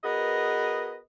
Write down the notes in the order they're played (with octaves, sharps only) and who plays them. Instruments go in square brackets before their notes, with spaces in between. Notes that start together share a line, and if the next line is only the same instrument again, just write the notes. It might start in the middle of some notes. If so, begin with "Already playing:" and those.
[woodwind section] B3 F#4 G#4 A#4 B4 D#5